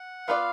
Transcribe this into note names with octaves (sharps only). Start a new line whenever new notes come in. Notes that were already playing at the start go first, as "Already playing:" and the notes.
Already playing: F#5
B3 F4 B4 D5 F5